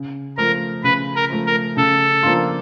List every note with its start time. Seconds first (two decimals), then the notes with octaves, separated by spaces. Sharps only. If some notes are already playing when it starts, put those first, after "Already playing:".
Already playing: C#3
0.37 F3 A3 A#4
0.84 C#3 B4
1.15 A#4
1.30 F3 A3
1.46 A#4
1.77 C#3 A4
2.23 F3 A#3 D4 F4